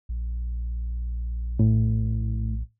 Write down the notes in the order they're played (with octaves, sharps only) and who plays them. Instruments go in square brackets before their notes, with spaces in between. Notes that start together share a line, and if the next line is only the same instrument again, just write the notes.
[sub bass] A#1
[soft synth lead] A2